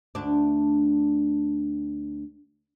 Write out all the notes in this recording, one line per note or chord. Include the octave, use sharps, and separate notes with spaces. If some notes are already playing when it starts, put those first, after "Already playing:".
D2 D4